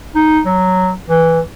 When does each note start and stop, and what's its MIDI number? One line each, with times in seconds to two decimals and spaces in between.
0.15 0.40 63
0.46 0.92 54
1.09 1.40 52